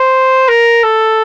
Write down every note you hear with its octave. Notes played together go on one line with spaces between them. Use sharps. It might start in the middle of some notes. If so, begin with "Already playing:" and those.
Already playing: C5
A#4
A4